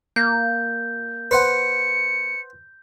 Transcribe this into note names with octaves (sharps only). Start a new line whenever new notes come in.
A#3 G6
B4 C5 F#5 C#7